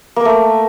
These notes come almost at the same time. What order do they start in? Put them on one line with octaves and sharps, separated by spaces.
A#3 A#4 A3